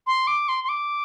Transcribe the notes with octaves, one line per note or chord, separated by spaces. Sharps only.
C6
D6
C6
C6
D6